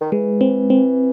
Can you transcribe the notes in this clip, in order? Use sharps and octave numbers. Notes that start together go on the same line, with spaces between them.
D#3
E3 G#3
C4
C4